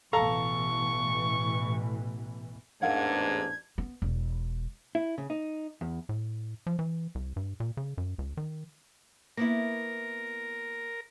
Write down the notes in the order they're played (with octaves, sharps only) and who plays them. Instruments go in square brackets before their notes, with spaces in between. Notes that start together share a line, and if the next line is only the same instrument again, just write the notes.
[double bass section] A1 B2 E3 [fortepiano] A4 F5 A#5 [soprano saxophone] C#6
[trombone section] A1 D4 [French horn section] E2 G#2 [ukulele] A#4 F5 F#5 [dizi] G#6
[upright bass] B3
E1
[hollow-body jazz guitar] E4
C#3
D#4
E2
[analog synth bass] A2
F3
E3
C2
G2
A#2
C#3
F#2
C#2
D#3
[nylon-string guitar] A#3 B3 E4 [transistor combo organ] A#4